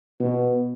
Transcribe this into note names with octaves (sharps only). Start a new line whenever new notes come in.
B2